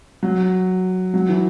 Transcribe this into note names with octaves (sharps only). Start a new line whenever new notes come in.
F#3
F#3
E3